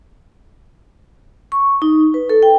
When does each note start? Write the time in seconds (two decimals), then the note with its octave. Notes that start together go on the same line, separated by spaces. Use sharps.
1.52 C#6
1.82 D#4
2.14 B4
2.30 A4
2.43 G5